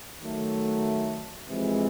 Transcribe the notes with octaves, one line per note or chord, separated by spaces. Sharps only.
D#3 F#3 A3
F2 C3 E3 G#3